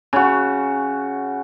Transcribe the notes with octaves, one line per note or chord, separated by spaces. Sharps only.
C#3 F#4